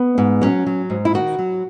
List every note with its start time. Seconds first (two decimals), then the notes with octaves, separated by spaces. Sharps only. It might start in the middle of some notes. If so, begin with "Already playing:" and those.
Already playing: B3
0.18 G#2
0.41 F#3 C#4
0.67 F#3
0.90 G#2
1.05 E4
1.14 D#3 F#4
1.39 F#3